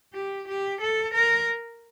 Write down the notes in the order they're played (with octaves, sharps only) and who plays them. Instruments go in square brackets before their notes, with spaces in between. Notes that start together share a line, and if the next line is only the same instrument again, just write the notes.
[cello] G4
G4
A4
A#4